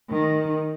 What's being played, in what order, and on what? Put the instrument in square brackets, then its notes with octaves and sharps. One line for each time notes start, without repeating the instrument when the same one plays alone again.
[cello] D#3